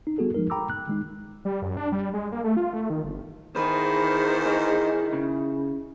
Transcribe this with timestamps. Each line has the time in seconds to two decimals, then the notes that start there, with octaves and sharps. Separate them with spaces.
0.07 D#4
0.18 G3 B3 F#4 G#4 A4
0.34 F3 G#3 D#4 A#4
0.50 G5 A#5 B5 D6 E6
0.70 F#6
0.88 D#3 G#3 D#4
1.45 G3
1.62 F#2
1.77 D4
1.92 G3
2.13 G#3
2.32 A#3
2.44 A3
2.57 F4
2.73 A3
2.90 D#3
3.04 G1
3.56 E2 G#2 D#3 E4 G#4 B4 C5
4.46 D#4
5.13 C#3